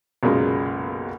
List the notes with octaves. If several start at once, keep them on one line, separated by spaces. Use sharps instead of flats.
B1 F#2 A#2 C#3 G#3 A#3